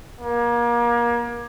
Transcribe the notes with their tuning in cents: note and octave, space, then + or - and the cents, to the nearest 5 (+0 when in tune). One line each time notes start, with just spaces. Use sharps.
A#3 +30